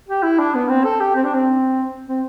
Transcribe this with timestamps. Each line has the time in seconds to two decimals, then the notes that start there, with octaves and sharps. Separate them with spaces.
0.08 G4
0.23 E4
0.39 D4
0.55 B3
0.69 C4
0.84 A4
1.00 G4
1.15 C4
1.24 D4
1.34 C4
2.07 C4